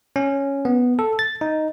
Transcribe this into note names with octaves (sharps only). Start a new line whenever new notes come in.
C#4
B3
A4
A6
D#4